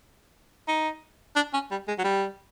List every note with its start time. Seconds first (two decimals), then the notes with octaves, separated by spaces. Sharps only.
0.68 D#4
1.36 D4
1.54 C#4
1.71 G3
1.88 G#3
1.99 F#3
2.04 G3